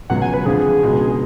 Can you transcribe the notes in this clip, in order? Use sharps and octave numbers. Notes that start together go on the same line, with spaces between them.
C#2 B2 F#3 F#5
G#5
B4
F2 D3 F3 G#4
C#2 B2 G#3